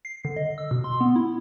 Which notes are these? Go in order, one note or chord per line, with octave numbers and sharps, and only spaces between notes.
C7
D3
D#5
E6
B2
C6
B3
E4